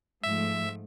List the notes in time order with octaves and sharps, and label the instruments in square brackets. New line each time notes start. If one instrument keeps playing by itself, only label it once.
[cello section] G#2 F3 A3 [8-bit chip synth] E5